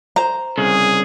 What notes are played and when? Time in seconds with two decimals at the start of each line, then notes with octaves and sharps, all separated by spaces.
0.16 C5 A#5
0.58 C2 C#3 G#4